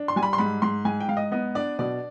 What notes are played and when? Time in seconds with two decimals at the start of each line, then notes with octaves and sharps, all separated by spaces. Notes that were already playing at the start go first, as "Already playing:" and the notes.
Already playing: D4
0.08 C6
0.16 G3 G#5
0.23 B5
0.33 C6
0.38 G#2 B5
0.62 G#2 C6
0.85 G#2 G#5
1.00 G5
1.08 G#2 F5
1.17 D#5
1.32 B3 D#5
1.55 D4 D5
1.79 B2 D5